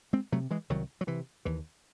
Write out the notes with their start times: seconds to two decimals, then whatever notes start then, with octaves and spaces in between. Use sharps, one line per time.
0.13 G#3 C4
0.32 C3 F#3 A3
0.51 E3 G#3
0.70 C2 D#3 F#3
1.01 F#3
1.07 C3 E3
1.45 D#2 E3